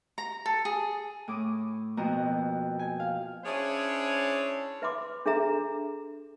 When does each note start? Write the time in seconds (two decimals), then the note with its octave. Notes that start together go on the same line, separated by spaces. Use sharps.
0.18 A#5
0.46 A4
0.65 G#4
1.28 A2 D6 D#6
1.97 F2 B2 A#3 F#4 D#5 A#5
2.79 G#5
3.00 F5
3.44 C#4 D4 E4 G#4 C5 C#5
4.82 B4 E5 B5 C6 D6
5.26 D4 G#4 A4 E5 A#5